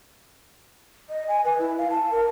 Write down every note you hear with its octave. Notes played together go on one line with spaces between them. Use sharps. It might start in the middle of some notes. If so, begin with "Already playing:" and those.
D#5
G#5
B4
E4
F5
A5
A#4